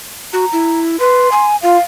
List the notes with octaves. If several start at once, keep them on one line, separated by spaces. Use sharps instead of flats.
F#4 A#5
E4
B4 C6
G#5
F4 F5